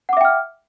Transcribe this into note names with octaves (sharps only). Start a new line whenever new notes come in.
E5 F#5 G5 D6 F6